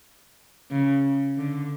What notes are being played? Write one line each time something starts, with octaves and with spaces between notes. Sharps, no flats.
C#3
D3